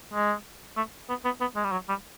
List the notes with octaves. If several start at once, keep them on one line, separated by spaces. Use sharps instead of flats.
G#3
A3
B3
B3
B3
G#3
G3
F#3
G3